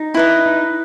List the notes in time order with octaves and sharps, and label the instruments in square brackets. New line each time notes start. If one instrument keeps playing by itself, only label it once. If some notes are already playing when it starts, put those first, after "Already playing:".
Already playing: [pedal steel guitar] D#4
[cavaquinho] E4 B4 D#5
[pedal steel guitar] D#4